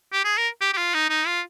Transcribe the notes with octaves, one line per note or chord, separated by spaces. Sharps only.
G4
G#4
A#4
G4
G4
F4
D#4
D#4
F4